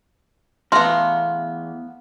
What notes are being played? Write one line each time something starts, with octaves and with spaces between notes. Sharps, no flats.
E2 A3 B3 F5 A#5 C6